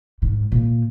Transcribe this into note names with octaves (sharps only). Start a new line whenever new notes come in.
G#2
A#2